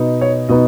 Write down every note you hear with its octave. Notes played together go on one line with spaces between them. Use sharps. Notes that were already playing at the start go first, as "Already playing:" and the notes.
Already playing: B2 B3 D#4
C#5
B2 B3 D#4 D#5